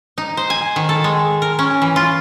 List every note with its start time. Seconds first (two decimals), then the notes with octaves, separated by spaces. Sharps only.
0.18 D#4
0.37 C5
0.50 G#5
0.76 D#3
0.89 A4
1.04 G#3
1.42 A#4
1.59 C#4
1.82 E3
1.96 F4